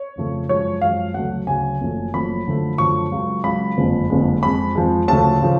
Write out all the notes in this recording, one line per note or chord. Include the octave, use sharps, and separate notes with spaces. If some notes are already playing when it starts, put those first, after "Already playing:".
Already playing: C#5
F2 C#3 F3 A3
F#2 F3 G#3 C#5
F#2 F3 G#3 F5
D2 C#3 F#3 A3 F#5
D2 C#3 F#3 A3 G#5
F#1 F#2 F3 A3
F#1 F#2 F3 A3 B5
F#2 D3 F3 A3
F#2 D3 F3 A3 C#6
C#2 C#3 F#3
C#2 C#3 F#3 B5
F#1 F2 D3 F3 G#3
F#1 F2 D3 F3 G#3
F2 F3 G#3 B5
F2 F3 G#3
D2 C#3 F3 A3 A5
C#3 F3